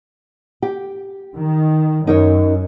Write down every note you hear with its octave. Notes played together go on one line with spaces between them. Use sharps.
G4
D#3
F#2 D#4 A#4 C#5